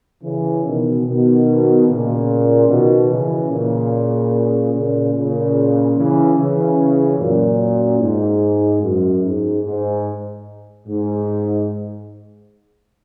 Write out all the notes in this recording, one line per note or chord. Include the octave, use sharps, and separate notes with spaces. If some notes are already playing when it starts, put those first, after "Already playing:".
C#3 E3
B2 D#3
B2 D#3
A#2 C#3
B2 D#3
C#3 E3
A#2 C#3
A#2 C#3
A#2 C#3
C#3 E3
C#3 E3
F#2 A#2
G#2
F#2
G#2
G#2
G#2